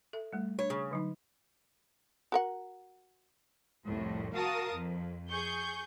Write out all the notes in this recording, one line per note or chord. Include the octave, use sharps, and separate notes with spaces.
A4 E5
G3 A3
D4 C#5
C#3
D3 F#3 D#4
F#4 A#4 F#5
C2 F2 A2
F#4 A#4 F5 A5 D#6
F2
G#4 C#6 G6